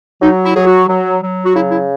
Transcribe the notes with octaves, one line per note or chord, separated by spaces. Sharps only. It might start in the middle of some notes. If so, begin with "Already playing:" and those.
F#3 D#4
E4
F#3 G#4
F#4
F#3
F#3
F#4
C#3 E4
E4